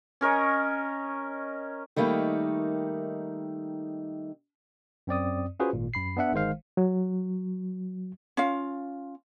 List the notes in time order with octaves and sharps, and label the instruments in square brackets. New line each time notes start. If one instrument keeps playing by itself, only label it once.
[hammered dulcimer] C#4 A#4 C#5 D#5
[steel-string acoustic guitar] D#3 G3 A3 A#3 D#4
[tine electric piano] F#2 C4 D5 D#6
C#4 F4 F#4 G#4 B4 C5
G#1 A#2
F#2 B5 C7
B3 D4 E5 F#5
G1 D#3 G#3 C5 F5
[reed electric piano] F#3
[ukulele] C#4 F4 F5